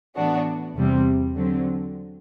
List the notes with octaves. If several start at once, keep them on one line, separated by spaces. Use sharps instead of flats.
A2 E3 B3 D4 F#4
E2 C3 G3 C4
D3 F#3 C4